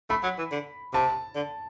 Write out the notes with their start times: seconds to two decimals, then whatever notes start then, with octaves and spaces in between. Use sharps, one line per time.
0.10 A3 B5
0.23 F#3
0.39 E3
0.52 D3
0.93 C3 A5
1.36 D3